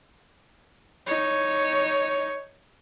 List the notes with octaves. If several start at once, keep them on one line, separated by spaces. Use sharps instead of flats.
D#4 C#5